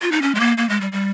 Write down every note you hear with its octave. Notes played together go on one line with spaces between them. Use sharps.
F4
D#4
C#4
G#3
A#3
A#3
G#3
G3
G3